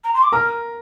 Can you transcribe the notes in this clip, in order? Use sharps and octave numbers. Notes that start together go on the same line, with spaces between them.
A#5
C6
D6
A#4 A#5 F6